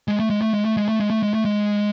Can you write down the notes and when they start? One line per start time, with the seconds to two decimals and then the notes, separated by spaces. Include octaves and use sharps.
0.08 G#3
0.19 A3
0.30 G#3
0.41 A3
0.54 G#3
0.65 A3
0.77 G#3
0.88 A3
1.00 G#3
1.10 A3
1.23 G#3
1.34 A3
1.45 G#3